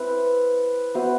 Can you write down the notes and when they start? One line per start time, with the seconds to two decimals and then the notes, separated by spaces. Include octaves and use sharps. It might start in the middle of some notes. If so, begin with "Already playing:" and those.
Already playing: C4 E4 B4 E5
0.95 B3 F#4 C5 E5